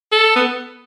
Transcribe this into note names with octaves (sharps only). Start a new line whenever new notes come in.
A4
B3